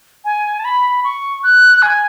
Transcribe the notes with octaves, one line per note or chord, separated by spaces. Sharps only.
G#5
A5
B5
C#6
F#6
G#5